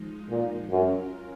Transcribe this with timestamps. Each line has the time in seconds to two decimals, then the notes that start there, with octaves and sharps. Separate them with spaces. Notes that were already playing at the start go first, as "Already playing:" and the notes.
Already playing: F3 G#3 D#4
0.30 A#2
0.70 F#2 F#3 C#4 F4 A#4